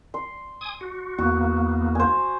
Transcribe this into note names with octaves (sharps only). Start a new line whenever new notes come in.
C6
G#5 D#6
F#4
E2 A#3 B3 F#4
C5 G#5